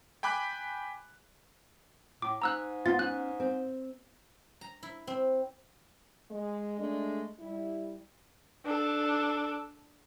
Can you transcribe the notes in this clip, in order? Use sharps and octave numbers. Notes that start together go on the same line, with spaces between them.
G5 G#5 B5 D6 F#6
A2 D6
G#2 A#5 E6 F#6
B3 F4 F#5 A6
C#4 F#6
C4
A#5
E4
C4
G#3 D#5
G#3 A3 D4
G3 E4
D4 A4